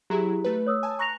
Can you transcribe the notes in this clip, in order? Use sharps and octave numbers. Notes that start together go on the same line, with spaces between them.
F#3 E4 G4 G#4 A#5
A3 B4
C#5 D#6 E6
G#5 A5
A#5 C#6 F#6 A#6 F7